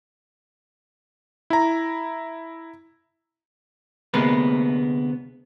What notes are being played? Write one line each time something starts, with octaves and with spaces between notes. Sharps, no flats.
E4 A#5
D2 C3 G#3 A#3 B3 B4